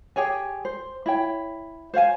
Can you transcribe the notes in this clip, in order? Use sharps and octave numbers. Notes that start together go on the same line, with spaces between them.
G4 G#4 C#5 G#5
C5
E4 C#5 G5
C5 C#5 F5 G#5